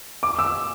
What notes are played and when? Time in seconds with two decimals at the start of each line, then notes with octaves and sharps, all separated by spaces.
0.23 D6
0.39 E6